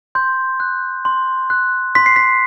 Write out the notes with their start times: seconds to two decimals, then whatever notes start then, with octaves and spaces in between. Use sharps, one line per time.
0.15 C6 G6
0.60 F#6
1.05 C6
1.50 F#6
1.95 C6 B6
2.06 C7
2.16 B6